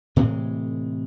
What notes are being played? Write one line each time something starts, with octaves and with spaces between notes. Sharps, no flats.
A2 C3 E3 G#3